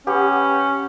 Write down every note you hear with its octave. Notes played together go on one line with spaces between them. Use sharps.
B3 C#4 G4